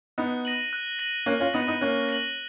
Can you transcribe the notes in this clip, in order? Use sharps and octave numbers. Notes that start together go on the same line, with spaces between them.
B3 D#4 F#6
A#6 D#7 F#7
F#6
A#6 D#7 F#7
A#3 C#4 F#6
C#4 F4
B3 D#4 A#6 D#7 F#7
B3 D#4
A#3 C#4 F#6
A#6 D#7 F#7